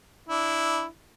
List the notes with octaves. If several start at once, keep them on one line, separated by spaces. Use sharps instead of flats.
D4 E4